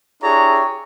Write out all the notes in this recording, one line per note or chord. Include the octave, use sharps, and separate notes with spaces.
D4 E4 G4 G#4 C#5 A#5